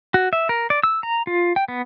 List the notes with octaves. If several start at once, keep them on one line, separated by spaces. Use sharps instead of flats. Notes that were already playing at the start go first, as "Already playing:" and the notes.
F#4
E5
A#4
D5
E6
A#5
F4
G5
B3